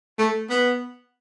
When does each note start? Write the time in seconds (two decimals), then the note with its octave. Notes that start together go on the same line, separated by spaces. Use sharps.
0.18 A3
0.50 B3